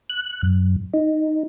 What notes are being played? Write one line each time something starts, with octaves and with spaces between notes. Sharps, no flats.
F#6
F#2
D#4